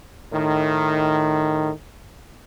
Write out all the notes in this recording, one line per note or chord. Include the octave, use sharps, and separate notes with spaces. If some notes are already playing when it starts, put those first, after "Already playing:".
A2 D#3